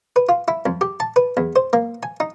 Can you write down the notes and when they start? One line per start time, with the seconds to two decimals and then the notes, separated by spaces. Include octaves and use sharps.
0.16 B4
0.29 F4
0.48 E4
0.66 F2
0.81 G4
1.00 A5
1.16 B4
1.37 E2
1.56 C5
1.73 A#3
2.03 G#5
2.20 D#4